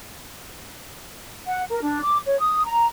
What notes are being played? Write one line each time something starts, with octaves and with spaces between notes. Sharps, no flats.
F#5
A#4
D4
D6
C#5
D#6
A#5